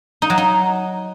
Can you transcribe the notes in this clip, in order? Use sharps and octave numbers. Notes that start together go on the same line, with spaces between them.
D#4
F#3
D#4